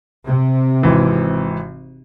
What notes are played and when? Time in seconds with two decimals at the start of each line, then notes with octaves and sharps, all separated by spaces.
0.25 C3
0.83 G#1 E3